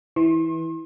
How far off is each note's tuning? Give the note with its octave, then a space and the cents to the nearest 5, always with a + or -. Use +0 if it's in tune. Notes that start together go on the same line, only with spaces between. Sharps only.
E3 -15 C6 +40